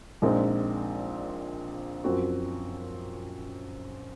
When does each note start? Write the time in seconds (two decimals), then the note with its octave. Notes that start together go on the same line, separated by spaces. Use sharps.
0.22 A#1 A#2 G#3 C4 D#4
2.04 F#2 F3 C4 F#4